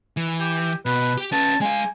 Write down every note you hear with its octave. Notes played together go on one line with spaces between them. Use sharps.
E3
G4
B2 B4
G4
C#4 B4 A5
G#3 F5 G#5